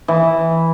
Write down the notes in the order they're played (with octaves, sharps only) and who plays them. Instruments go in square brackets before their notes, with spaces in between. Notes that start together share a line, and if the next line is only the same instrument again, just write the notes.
[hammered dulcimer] E3